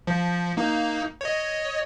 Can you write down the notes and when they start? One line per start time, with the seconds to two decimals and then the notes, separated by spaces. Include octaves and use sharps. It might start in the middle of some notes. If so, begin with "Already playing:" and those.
0.07 F3
0.57 A#3 D#4
1.21 C#5 D#5